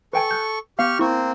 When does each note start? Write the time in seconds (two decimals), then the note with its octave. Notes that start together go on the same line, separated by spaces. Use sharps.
0.13 A4 B4 G5 G#5 C#6
0.31 F#6 G6
0.79 B3 G4 F5 C#6 F6
0.99 A#3 C4 E4 C#6